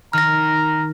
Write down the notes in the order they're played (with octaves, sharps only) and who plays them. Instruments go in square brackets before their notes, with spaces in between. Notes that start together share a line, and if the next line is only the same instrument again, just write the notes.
[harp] D#3 [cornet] A#5 [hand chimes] F6 A#6